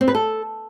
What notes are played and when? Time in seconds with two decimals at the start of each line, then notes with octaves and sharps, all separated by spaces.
0.01 C4
0.08 B4
0.15 A4